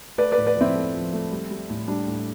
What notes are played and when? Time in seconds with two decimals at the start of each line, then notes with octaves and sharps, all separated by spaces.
0.18 A3 B4 D5
0.32 B4 D5
0.38 A2
0.46 B4 D5
0.57 F3 C4 E4
0.75 A3
0.93 F3
1.13 A3
1.32 G3
1.51 G3
1.70 A2
1.88 G3 D4
2.07 A2